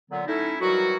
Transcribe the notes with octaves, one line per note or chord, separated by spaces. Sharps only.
A#2 D3 F#3 B3
A3 C#4 D#4 E4
D#3 E3 F#3 G3 F#4